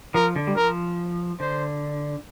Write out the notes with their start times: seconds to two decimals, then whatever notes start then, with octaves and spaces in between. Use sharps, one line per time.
0.14 F3 A#4
0.36 D3
0.47 G3
0.56 F3 A#4
1.40 D3 C5